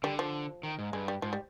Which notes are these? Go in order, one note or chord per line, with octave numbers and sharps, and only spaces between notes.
D3 G3
F3
D#3
G#2
G2 G#3
G3
G#2 F3
G3